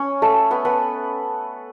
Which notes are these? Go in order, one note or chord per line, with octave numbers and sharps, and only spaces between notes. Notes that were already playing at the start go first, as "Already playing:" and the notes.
Already playing: C#4 C#5
A3 A4
B3 B4
B3 B4